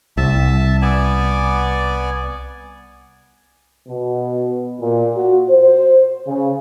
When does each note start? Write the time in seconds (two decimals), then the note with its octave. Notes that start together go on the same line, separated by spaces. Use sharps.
0.17 C2 E5 A5
0.82 B3 D5 G#5
3.88 B2
4.79 A#2
5.15 F#4
5.47 C5
6.26 C#3